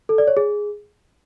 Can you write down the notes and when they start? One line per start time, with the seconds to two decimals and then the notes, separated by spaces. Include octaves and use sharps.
0.09 A4
0.18 D5
0.27 C#5
0.37 G#4